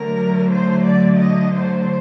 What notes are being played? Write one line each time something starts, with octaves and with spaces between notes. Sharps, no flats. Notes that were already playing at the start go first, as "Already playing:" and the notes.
Already playing: D3 F#3 A3 A#4
C5
D5
D#5
C5